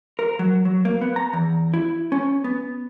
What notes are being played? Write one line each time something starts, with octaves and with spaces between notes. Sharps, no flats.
A#4
F#3
F#3
A#3
B3
A#5
E2
E4
C#4
B3